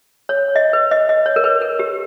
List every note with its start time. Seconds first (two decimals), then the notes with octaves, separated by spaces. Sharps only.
0.29 C#5
0.56 D#5
0.73 B4
0.91 D#5
1.09 D#5
1.26 C#5
1.36 A#4
1.44 B4
1.62 A#4
1.79 G4